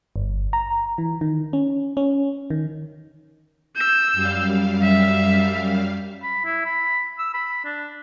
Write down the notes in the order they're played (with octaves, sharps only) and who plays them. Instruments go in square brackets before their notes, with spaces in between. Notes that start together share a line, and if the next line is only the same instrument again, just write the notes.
[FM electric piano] G1
A#5
E3
D#3
C#4
C#4
D#3
[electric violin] E6 G6
[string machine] F#2 G3 F5
[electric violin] E5
[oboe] B5
E4
B5
E6
B5
D4